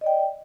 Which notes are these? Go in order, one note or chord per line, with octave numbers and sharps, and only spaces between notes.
D5 D#5 G5